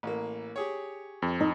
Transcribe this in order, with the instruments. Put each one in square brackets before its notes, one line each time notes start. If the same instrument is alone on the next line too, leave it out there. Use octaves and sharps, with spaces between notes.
[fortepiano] A1 A#3
G4 G#4 C#5
[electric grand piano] F2
[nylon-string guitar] D#4